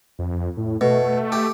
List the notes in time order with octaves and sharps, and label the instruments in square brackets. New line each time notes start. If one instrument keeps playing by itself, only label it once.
[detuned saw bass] F2
A2
[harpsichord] B2 [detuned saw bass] A3
[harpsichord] G4